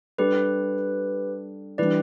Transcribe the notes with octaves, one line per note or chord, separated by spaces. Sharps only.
G3 D4 G4 A4 B4
E3 G3 D4 B4 D5